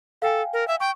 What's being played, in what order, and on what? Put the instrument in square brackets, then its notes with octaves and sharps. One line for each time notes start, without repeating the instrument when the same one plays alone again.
[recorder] A4 [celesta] F5 G5 G#5
[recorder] A#4
E5
[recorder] G5 [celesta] C#6